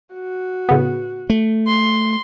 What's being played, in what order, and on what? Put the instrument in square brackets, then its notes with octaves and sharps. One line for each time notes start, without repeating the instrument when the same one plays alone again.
[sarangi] F#4
[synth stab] A2 C#3 B3
[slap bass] A3
[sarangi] C6